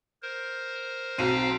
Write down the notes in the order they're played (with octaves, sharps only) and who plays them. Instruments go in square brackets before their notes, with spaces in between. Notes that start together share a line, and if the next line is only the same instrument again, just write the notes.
[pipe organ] A#4 C5
[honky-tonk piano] B1 F#3 D#7 [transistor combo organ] C4 [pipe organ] F5 G5 A#5